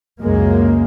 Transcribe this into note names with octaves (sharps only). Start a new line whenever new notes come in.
C#2 F#2 G#3 A#3